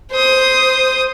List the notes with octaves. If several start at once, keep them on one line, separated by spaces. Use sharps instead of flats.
C5 D#6